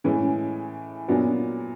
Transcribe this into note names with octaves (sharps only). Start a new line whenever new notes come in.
A2 E3 G#3 C#4
A#2 F#3 B3 D4